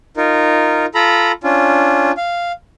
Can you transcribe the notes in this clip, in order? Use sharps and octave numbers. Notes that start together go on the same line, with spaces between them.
D#4 F4 A#4
F4 A4 A#5 B5
C#4 D4 F4
F5